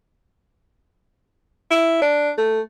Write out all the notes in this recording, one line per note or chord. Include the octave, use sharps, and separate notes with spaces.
E4
D4
A3